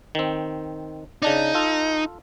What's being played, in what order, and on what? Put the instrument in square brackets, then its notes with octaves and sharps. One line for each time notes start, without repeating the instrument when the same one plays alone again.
[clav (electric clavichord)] D#3 C4
[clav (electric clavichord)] C#3 D4 D5 [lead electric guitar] D#4
[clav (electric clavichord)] F4 A4